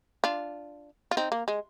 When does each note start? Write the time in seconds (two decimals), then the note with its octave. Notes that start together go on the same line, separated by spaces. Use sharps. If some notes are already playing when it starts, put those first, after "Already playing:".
0.24 D4 F4
1.11 F4
1.17 C4 D#4
1.32 A#3
1.48 G#3